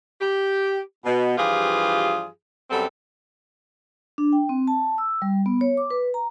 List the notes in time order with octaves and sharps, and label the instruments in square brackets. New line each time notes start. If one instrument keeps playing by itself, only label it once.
[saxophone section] G4
B2
G2 E3 F3 F4 G4 G#4
F#2 G3 B3 C4 A4
[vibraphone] D4
G5
C4
A5
E6
G3
B3
C#5
D6
B4
A#5